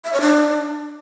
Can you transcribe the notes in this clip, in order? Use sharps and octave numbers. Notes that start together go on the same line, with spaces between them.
E5
C#5
D4